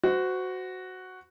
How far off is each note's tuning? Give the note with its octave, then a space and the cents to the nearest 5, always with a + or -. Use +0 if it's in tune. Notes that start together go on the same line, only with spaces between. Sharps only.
F#4 +0 C5 -30